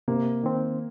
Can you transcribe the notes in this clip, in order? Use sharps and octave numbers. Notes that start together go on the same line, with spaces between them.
C3 A#3
D#3 C4